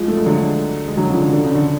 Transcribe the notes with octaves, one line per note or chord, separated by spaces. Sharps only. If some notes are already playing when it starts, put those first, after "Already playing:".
Already playing: F3 G#3
A3
G#3
D3 F#3
G#3
D3 F#3
C#3 F3
D3
D3
C#3
D3